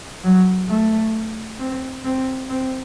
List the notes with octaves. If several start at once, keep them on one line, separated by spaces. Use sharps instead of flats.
F#3
A3
C4
C4
C4